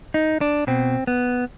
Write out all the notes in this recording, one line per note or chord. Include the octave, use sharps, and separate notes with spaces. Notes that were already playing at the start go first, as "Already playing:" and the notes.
D#4
D4
B2 C4
B3